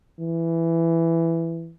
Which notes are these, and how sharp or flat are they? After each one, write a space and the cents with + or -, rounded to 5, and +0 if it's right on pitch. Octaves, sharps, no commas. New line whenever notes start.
E3 +10